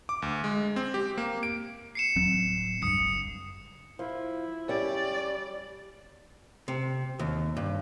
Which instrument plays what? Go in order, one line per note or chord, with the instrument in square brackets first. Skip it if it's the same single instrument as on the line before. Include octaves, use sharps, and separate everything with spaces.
[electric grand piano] D6
D2
G#3
C4
G4
A#3
D7
[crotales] C7 C#7 E7
[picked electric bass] D1 F#3 C4
[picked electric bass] C#2 G2 [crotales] D#6 C#7
[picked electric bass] F#1
[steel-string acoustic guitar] F3 [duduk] E4
[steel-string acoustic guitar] G3 C#4 G4 [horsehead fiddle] D5
[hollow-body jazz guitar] C3
D#2
G2